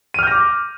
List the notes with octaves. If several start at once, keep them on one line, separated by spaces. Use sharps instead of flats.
D6 F6 G6 A#6 D#7